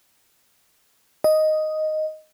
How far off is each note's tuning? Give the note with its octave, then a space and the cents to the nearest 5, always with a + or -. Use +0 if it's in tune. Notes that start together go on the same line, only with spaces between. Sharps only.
D#5 +0